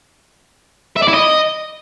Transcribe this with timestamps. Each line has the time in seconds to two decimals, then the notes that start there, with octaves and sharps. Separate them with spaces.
0.96 E5
1.02 D5
1.08 E4
1.14 D#5